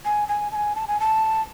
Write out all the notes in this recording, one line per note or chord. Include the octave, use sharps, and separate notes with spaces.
G#5
G#5
A5
G#5
A5
G#5
A5